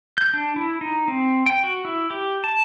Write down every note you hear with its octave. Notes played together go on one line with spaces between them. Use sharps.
G6
D4
E4
D#4
C4
G5
F#4
E4
G4
A5